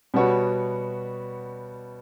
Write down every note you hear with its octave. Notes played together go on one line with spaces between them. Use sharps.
B2 G3 B3 F#4 C#5